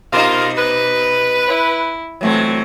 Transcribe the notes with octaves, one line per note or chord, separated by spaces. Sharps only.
B2 D#4 F4 A#4 F5
B4
E4
A#2 E3 F#3 A3 C4